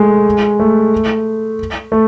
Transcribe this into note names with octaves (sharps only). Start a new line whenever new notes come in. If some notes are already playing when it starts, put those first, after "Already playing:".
Already playing: G#3 A3
A3
A3